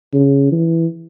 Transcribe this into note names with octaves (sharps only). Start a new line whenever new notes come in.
C#3
E3